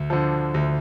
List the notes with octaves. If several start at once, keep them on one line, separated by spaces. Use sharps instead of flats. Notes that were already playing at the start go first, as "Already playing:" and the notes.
Already playing: D2
D3 F3
D2